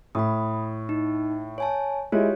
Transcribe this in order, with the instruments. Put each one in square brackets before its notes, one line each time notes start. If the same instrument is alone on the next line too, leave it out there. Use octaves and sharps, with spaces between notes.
[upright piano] A2 [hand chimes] B5 D#6
[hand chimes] D#4
C#5 G#5 A5
[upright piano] G#3 E4 [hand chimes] F4 G4 C#5